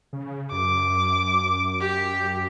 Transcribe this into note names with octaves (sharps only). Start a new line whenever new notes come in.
C#3
F#2 D6
G4